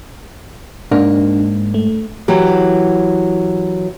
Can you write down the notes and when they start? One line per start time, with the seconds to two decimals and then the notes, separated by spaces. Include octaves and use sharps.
0.91 G#2 A#3 D4
1.74 A3
2.28 E3 F#3 G4